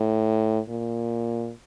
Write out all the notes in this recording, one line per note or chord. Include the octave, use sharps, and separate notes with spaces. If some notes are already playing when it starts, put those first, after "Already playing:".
Already playing: A2
A#2